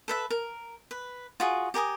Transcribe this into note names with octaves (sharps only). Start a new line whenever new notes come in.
A4 B4 E5
A#4
B4
F4 F#4 G#4
G4 A#4 G#5 D#6